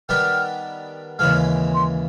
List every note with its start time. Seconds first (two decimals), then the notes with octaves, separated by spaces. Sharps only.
0.09 D#3 G3 B3 D4 G4 F6
1.19 D#2 C#3 E3 G#3 F6
1.74 C6